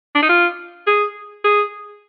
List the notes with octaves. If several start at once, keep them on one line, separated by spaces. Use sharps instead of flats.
D4
D#4
F4
G#4
G#4